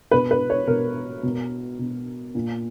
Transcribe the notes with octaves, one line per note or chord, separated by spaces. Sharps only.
B2 B4
B4
C#5
B2 A#4
B2
B2
A#2